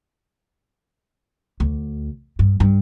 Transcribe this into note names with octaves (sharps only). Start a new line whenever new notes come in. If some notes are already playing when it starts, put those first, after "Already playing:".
D2
G2
G2